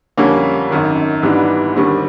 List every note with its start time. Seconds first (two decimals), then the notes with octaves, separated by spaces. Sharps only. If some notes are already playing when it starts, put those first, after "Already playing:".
0.17 F2 D3 G3 A#3 C#4
0.70 G#1 F#2 D#3
1.22 G#2 E3 G3 B3 D4
1.75 D#2 D3 G3 C4